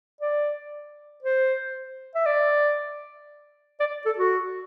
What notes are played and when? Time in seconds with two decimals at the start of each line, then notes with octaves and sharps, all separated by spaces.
0.21 D5
1.23 C5
2.15 E5
2.26 D5
3.80 D5
4.06 A4
4.18 F#4